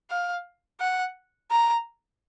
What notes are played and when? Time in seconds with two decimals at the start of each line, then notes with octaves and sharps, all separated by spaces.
0.10 F5
0.80 F#5
1.51 A#5